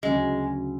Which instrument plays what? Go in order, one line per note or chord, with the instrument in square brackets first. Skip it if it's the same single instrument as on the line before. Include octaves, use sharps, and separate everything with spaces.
[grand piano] D2 C#3 F#3 C#4 [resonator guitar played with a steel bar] G#3